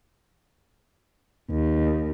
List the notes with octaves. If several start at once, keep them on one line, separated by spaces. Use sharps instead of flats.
D#2